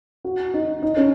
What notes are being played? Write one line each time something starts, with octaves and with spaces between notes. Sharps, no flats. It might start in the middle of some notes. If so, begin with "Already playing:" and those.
F#4
D#4
D#4
C#4